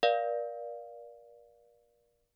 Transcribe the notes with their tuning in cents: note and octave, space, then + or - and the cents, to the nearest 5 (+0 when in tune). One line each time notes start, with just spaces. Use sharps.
A#4 +35 D5 +0 F5 +0